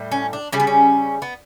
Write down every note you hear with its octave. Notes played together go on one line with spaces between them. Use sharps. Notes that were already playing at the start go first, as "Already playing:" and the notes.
Already playing: A2 G3
C#4
D4
C#3 G3 C#4
B3
C#4
B3